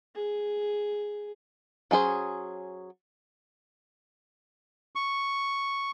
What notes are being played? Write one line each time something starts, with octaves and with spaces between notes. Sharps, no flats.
G#4
F#3 C#4 G#4 C5
C#6